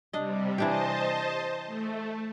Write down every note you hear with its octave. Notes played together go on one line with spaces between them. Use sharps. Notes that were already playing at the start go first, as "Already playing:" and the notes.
C3 G3 D4 D#5
E3 D4 G4 C5 D#5 A5
A3